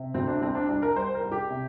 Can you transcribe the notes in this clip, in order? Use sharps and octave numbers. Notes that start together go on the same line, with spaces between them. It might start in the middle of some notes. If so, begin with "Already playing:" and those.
Already playing: C3
D2 C4
D4
C2 C4
D4
C2 D4
A#4
G3 C5
A#4
C2
G4
C3